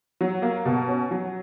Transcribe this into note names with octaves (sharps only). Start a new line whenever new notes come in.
F#3
A#3
B2
C#4
F#3